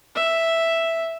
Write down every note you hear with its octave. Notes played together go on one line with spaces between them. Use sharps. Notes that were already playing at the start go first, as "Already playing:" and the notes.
E5